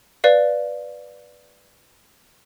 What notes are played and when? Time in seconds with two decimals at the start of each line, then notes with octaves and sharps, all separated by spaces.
0.24 B4 D5 F5